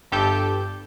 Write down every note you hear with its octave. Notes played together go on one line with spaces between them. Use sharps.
G1 G2 G4 A4 G6